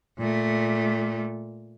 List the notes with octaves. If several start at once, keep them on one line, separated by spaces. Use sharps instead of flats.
A#2 A3